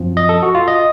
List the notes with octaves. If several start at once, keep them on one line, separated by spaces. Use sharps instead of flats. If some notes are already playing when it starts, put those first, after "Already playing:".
Already playing: F#2 F3 C4
D#5
A4
F#4
F4
D#5